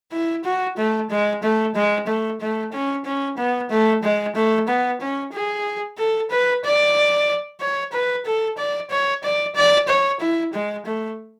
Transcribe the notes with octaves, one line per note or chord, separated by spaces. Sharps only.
E4
F#4
A3
G#3
A3
G#3
A3
A3
C#4
C#4
B3
A3
G#3
A3
B3
C#4
G#4
A4
B4
D5
C#5
B4
A4
D5
C#5
D5
D5
C#5
E4
G#3
A3